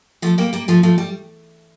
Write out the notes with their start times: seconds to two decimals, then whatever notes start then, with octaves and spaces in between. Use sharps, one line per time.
0.22 F3 A3
0.38 G3 A#3
0.53 G3 A#3
0.68 F3 A3
0.83 F3 A3
0.98 G3